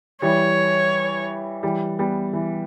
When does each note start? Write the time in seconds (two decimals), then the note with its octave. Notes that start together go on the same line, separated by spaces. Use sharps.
0.22 E3 G3 C#5
1.63 E3 G3
1.99 G3 B3
2.33 E3